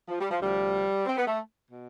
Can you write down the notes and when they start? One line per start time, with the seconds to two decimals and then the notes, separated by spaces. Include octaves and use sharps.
0.08 F3
0.19 G3
0.30 F3
0.41 D2 C3 F3 G3
1.05 C4
1.17 B3
1.27 A3
1.70 B2